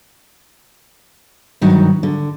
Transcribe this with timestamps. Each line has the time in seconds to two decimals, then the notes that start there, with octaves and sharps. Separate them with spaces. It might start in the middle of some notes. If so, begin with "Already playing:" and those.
1.61 G2 D#3 F#3
2.03 D3